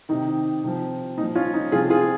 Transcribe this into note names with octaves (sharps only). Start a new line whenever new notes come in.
C3 D#3 D#4
C3 F3
A#2 D#4
F3
C#4 F4
D#4
C3 F3 F4 G#4
F4 G#4